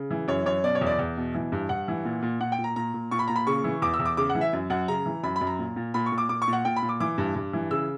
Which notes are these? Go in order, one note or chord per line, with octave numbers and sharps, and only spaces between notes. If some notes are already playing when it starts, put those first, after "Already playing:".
Already playing: C#3
E3
F#2 C#5
F#2 C#5
B2 D5
C#5
E2
D5
E2
B2
E3
G2
G2 F#5
E3
A#2
A#2
A#2 F#5
G5
A#2
A#5
A#2 A#5
A#2
A#2 C#6
B5
A#2 A#5
B5
C#3 C#6
E3
E2 D6
E6
E2
D6
C#3 D6
F#5
E3
E5
F#2
F#2 F#5
C#3 A#5
E3
F#2 B5
B5
F#2
A#5
A#2
A#2
A#2 B5
C#6
A#2
D6
A#2 D6
C#6
A#2
F#5
A#2 G5
B5
A#2
D6
E3 D6
G2
G2
E3
C#3 E6